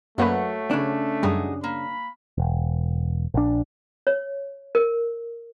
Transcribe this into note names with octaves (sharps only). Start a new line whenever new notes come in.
F#2 F#3 A3 A#3 B4 C#5 F#5
C#3 D4
F#2 G3 D#4 F#4 G#4
A#3 B5
E1
A#1 D4
C#5
A#4